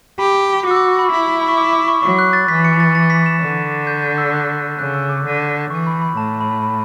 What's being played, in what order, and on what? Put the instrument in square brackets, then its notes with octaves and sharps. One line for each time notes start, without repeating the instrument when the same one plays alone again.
[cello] G4 [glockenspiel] B5
[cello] F#4 [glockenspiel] D6
[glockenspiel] E6
D6
C#6
B5
[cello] E4
[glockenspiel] B5
C#6
D6
D6
C#6
[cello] F#3 [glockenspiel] C#6
[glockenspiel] F#6
A6
[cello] E3 [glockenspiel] B6
[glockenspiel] C#7
A6
A6
B6
E7
[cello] D3
[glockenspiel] G6
G6
E6
F#6
[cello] C#3 [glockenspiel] F#6
[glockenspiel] E6
D6
[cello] D3
[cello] E3 [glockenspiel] C#6
[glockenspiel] B5
B5
[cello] A2 [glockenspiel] A5
[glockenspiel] B5
B5